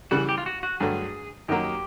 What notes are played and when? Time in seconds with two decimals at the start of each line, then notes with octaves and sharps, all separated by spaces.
0.11 C#3 E3 G3 F#4
0.29 G4
0.38 F4
0.46 F#4
0.63 F#4
0.80 G2 D3 F#3 A3 G#4
1.48 F#2 D#3 F#3 A#3 G4